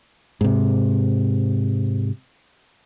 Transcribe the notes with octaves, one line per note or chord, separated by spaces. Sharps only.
G#2 C3